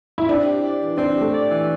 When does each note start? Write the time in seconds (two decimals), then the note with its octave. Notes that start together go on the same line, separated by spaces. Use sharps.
0.18 E4
0.29 C4 D4
0.46 G4
0.64 D5
0.81 E3
0.98 C4 D4
1.15 G4
1.21 A3
1.33 D5
1.50 E3